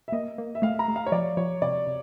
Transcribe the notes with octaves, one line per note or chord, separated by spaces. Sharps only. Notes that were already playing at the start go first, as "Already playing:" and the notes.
E5
A#3 D#5
A#3
E5
A3 F5
A#5
A3
F5
C#5
F3 D5
F3 C#5
C3 D5
C3